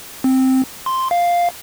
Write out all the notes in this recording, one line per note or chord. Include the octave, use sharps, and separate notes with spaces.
C4
C6
F5